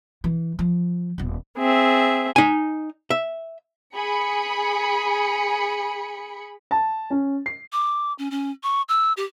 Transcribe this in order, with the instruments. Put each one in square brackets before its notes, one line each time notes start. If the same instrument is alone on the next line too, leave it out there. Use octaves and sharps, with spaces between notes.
[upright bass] E3
F3
D#1 B3
[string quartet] C4 G#4 E5
[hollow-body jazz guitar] D#4 G#5
E5
[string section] G#4 B5 C#7
[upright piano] A5
C#4
C7
[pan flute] D6
C#4
C#4
C#6
E6
G4